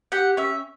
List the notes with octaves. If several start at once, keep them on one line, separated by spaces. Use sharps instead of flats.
G4 F#5
C#4 E5